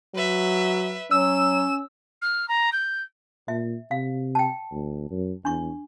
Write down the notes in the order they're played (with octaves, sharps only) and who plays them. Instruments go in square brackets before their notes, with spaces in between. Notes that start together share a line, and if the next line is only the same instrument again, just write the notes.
[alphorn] F#3 [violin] B4 E5
[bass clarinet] F#3 [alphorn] C#4 [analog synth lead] E6 [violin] E7
[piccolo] F6
A#5
G6
[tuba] A#2 [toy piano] E5
[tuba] C3 [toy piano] F5
[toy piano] G5 A5
[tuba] D2
F#2
[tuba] E2 [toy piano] D4 C#6